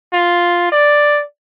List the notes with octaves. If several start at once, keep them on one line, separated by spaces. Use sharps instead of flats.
F4
D5